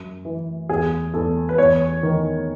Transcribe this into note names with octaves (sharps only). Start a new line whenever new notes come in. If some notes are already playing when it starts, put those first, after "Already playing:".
Already playing: F#2
E3
E2 G#4
E2 A4
B4
E2 C#5
D#3